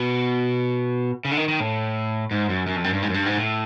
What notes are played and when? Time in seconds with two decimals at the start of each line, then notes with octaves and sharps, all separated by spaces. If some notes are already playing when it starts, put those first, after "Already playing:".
Already playing: B2
1.25 C#3
1.31 D3
1.37 D#3
1.48 D#3
1.60 A2
2.31 G#2
2.49 F#2
2.67 F#2
2.76 F2
2.84 F#2
2.93 G2
3.03 G#2
3.10 F#2
3.14 G2
3.26 G#2
3.38 A2